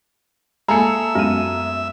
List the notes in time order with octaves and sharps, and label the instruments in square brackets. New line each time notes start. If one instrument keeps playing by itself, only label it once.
[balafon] G#3 A#3 [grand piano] G#4 A4 [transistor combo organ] E5 [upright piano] A#5 C#7
[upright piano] F#2 D#7 [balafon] G#3 B3